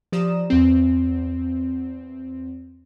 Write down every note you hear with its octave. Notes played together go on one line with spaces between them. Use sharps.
F3 G4 D5 A#5 D#6 E7
E2 C4